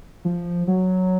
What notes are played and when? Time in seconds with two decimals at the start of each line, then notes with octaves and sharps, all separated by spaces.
0.25 F3
0.67 F#3